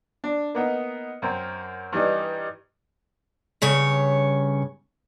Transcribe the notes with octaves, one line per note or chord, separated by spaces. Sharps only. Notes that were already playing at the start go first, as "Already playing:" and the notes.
D4
A#3 B3 D#4
F#2 C4 A#4
G2 E3 G3 D#4
G2 C#3 C#5